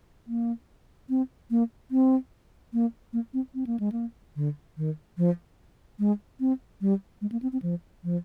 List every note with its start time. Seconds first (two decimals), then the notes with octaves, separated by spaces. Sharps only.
0.27 A#3
1.09 C4
1.51 A#3
1.91 C4
2.73 A#3
3.13 A#3
3.34 C4
3.55 C4
3.67 A#3
3.80 G#3
3.92 A#3
4.36 D3
4.77 D#3
5.18 F3
5.99 G#3
6.40 C4
6.81 G3
7.21 G#3
7.32 A#3
7.42 C4
7.53 C4
7.62 F3
8.04 F3